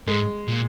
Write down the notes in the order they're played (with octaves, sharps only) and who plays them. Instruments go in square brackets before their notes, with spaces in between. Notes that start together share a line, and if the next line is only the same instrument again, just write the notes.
[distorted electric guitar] G#2 [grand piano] G#3
[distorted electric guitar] A#2